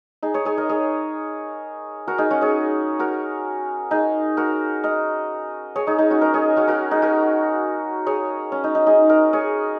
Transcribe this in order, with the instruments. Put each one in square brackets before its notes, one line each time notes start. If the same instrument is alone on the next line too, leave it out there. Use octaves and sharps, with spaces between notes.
[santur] D#4 G#4
G#4 C#5
G#4 C#5
A#4 D#5
G#4 C#5
F#4 A#4
D#4 G#4
C#4 F#4
G#4 C#5
F#4 A#4
D#4 G#4
F#4 A#4
A#4 D#5
G#4 C#5
D#4 G#4
D#4
C#4 F#4
A#4 D#5
G#4 C#5
C#4 F#4
F#4 A#4
D#4 G#4
F#4 A#4
G#4 C#5
C#4
D#4
D#4
D#4 G#4
A#4 D#5
G#4 C#5